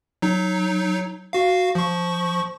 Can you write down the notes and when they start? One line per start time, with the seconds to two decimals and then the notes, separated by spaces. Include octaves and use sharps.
0.22 F#3 D#4
1.33 F#4 F5
1.75 F3 C#6